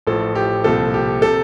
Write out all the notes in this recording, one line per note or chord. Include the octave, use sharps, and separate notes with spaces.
A1 A2 F3 A4
G4
C2 A#2 F3 A4
G4
C3 A4